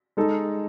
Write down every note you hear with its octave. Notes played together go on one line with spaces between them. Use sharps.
G#3 D#4 A4